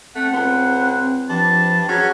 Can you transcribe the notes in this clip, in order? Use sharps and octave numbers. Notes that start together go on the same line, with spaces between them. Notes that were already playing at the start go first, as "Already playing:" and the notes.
A3 C4 F#5
C#2 C4
G2 F3 A5
F#3 C#4 G#4